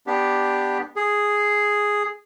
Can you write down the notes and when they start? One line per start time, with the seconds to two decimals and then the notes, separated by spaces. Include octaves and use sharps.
0.07 B3 D4 G4
0.96 G#4